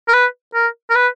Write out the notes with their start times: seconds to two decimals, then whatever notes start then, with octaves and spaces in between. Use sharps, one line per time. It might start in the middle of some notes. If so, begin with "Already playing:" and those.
0.08 A#4
0.13 B4
0.54 A#4
0.90 A#4
0.95 B4